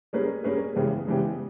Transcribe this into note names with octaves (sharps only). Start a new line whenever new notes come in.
G3 A#3 C#4 G#4 B4
G3 A#3 C#4 G#4 B4
C#3 E3 G#3 B3 G4
C#3 E3 G#3 B3 G4